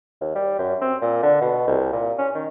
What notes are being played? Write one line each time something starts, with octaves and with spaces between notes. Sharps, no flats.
D#2
G3
F#2
C4
A#2
D3
B2
C2
A#2
C#4
D#3